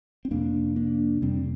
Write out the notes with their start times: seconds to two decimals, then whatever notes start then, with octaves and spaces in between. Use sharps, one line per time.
0.25 C4
0.31 F2 C3 A#3 D4
0.76 A#3 D4
1.22 F2 C3 G3 C4